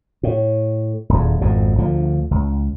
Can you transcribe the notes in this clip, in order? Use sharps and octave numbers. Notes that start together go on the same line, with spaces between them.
A2
D#1 E2
G#1 F2 B2
D2 D3 F3
C#2